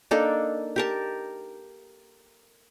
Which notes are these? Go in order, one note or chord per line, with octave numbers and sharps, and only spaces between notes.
A#3 D4 D#4 A4
G4 A#4 A5